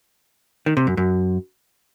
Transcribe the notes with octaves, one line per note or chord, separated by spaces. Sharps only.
D#3
C3
F#2
F#2